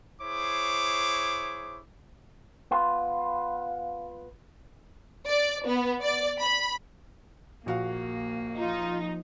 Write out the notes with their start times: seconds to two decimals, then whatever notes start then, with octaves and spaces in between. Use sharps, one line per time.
0.22 E4 G#4 C5 C#5 D6
2.71 B3 F4
5.28 D5
5.67 B3
6.02 D5
6.40 B5
7.66 A#1 A#3 F#4 F5
8.57 F3 D#4 F4